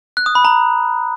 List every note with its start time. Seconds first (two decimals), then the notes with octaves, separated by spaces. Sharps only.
0.17 F#6
0.26 D#6
0.35 B5
0.45 A#5